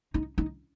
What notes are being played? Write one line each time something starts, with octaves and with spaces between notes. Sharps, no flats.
D#4
D#4